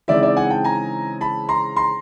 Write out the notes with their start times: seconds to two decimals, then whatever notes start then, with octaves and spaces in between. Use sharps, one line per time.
0.08 C#3 E3 G#3 C4 D#4 D5 E5
0.23 D5 E5
0.36 F#5 G#5
0.50 G5 A5
0.64 G#5 A#5
1.21 A5 B5
1.49 A#5 C6
1.76 A#5 C6